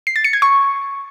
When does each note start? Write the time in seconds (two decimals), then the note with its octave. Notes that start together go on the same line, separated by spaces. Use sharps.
0.07 C7
0.16 A6
0.24 C#7
0.33 G#6
0.42 C#6